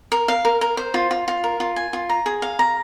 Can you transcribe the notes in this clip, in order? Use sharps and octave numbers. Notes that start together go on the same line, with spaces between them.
A#4
F5
A#4
A#4
C5
F4
F4
F4
A#4
F4
G#5
F4
A#5
G#4
F5
A#5